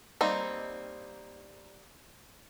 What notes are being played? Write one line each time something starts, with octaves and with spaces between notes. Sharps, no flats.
G3 A#3 C4 D#4